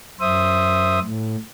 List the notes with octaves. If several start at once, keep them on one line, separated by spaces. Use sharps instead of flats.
F#2 C5 E5 D#6
A2